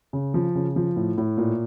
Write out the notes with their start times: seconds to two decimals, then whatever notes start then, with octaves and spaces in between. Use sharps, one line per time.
0.13 C#3
0.34 F3
0.55 C#3
0.76 F3
0.96 A2
1.18 A2
1.37 A#2